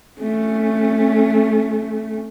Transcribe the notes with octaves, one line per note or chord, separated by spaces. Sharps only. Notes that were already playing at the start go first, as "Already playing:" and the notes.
A3 C#4